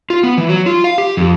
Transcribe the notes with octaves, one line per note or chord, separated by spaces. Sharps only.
F4
B3
E3
F#3
F4
F5
G4
F2